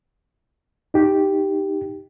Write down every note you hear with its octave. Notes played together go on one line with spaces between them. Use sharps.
D#4 G4